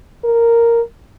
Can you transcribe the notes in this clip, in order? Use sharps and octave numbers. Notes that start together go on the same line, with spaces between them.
A#4